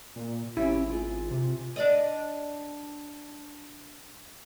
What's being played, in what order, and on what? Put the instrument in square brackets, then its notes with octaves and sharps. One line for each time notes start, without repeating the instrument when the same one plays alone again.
[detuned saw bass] A#2
[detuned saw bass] G#1 [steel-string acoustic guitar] C4 C#4 G4 [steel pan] E4
[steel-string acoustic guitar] F4 G#4
[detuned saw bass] C3
[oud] D4 D5 D#5